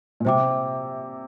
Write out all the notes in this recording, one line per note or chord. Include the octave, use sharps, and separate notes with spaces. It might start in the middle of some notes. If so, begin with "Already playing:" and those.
A#2
C3 C5 E5 G5 D6